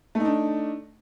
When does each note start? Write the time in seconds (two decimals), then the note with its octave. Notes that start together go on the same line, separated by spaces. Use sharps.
0.15 A3
0.20 D#4
0.25 D4